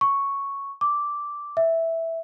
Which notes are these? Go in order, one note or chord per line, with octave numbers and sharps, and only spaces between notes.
C#6
D6
E5